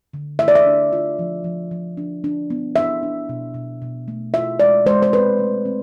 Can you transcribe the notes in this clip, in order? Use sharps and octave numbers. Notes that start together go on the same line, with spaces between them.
D3
A3 E5
D5
E5
D4
F4
F3
F3
F3
D4
D4
B3
D4 E5
D4
B2
B2
B2
A3
F4 E5
G#3 D5
G#3 C5
C5
C4 B4
A3
C4